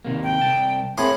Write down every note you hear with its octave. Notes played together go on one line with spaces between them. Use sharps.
D#2 C3 A#3
G5
C2 A5
A2 C4 G#4 A#4 B5 C6